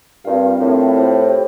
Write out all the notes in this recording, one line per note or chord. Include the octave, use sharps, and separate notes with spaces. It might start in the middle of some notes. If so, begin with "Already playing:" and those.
G2 C4 F4 A#4 F5
A2 C4 F4 A#4 F5
E4 G4 C5 G5
E4 G4